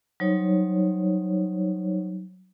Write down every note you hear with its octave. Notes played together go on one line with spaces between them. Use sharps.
F#3 G3 D#4 C5 C#5